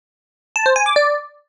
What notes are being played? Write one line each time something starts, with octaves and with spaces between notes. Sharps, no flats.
A5
C5
G#5
D6
D5